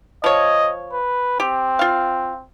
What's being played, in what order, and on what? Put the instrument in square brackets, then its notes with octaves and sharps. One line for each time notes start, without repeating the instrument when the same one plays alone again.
[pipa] F3 C#5 [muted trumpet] D#5
[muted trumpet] B4
[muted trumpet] C4 [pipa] G4
[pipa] F4 F5